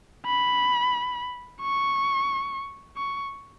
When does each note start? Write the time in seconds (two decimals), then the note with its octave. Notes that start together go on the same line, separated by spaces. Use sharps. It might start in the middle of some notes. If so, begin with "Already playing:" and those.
0.26 B5
1.62 C#6
2.97 C#6